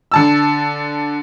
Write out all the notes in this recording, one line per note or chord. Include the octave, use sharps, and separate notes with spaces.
D3 A5 E6